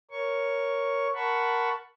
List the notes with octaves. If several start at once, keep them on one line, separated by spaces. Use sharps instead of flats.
A#4 C#5 C#6
A#4 F#5 A5 B5 C#6